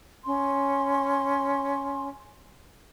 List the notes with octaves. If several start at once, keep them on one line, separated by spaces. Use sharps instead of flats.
C#4 C6